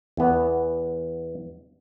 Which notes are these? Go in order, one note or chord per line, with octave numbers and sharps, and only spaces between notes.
E2 B3